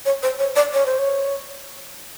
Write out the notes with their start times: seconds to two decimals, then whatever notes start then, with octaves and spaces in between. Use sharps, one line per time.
0.05 C#5
0.23 C5
0.39 C#5
0.56 D5
0.73 C#5
0.86 C5
0.99 C#5